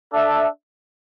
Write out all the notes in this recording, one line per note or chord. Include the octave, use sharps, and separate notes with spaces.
D4 A4 E5